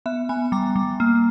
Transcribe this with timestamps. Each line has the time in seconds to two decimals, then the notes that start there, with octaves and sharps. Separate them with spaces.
0.06 B3 E5
0.29 B3 G#5
0.52 G3 A#5
0.76 G3
1.00 A#3